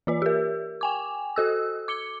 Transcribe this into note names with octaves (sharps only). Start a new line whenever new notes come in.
E3 F4 D5
G4 A#4
G5 G#5 D6
F#4 A4 E6
D6 C#7 G7